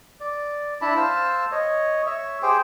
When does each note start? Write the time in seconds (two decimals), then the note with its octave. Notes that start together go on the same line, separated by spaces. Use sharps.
0.20 D5
0.81 D4 E4 A5 B5
0.97 C5 F5 A5 E6
1.52 C#5 D#5
2.06 C#5 E5
2.42 G4 G#4 C5 G5